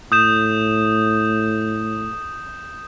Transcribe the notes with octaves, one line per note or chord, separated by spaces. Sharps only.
A2 D#6 G6 E7